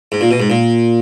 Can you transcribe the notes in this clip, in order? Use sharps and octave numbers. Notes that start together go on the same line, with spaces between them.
G#2
A#2
B2
G#2
A#2